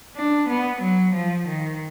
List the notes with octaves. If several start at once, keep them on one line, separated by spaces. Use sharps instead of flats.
D4
B3
F#3
F3
D#3